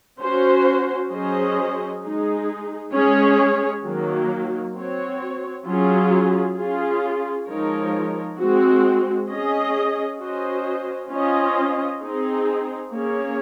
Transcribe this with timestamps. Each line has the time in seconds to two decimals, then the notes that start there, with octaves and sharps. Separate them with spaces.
0.21 C#4 F#4 C5
1.11 F#3 C#4 G#4 C5 D#5
2.02 G#3 D#4 G#4
2.93 G#3 C#4 G#4 C#5
3.84 D#3 F#3 A#3
4.76 C4 F#4 C#5
5.66 F#3 C#4 F4 G#4
6.56 C#4 F4 G#4
7.47 F3 G#3 D#4 A#4 C#5
8.38 G#3 C4 F#4
9.29 C#4 G#4 D#5
10.20 C#4 F#4 C5 D#5
11.10 C#4 F4 C5 D#5
12.02 C4 D#4 G#4
12.92 A#3 C#4 G#4 C#5